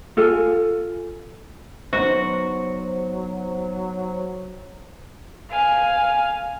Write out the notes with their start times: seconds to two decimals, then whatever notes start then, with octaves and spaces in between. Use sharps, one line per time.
0.17 F4 A4 G#5
1.93 F#3 B3 D#4 F#4 C5
5.50 F5 G#5